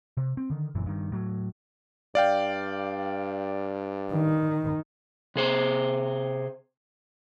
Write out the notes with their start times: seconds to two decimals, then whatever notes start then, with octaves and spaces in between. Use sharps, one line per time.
0.17 C3
0.37 C4
0.50 D3 D#3
0.75 F#1 F#2 A#2 E3
0.86 G2 D#3
1.12 A2 F#3
2.15 G2 D5 F5 G5
4.13 D#3
5.36 C3 G#4 C5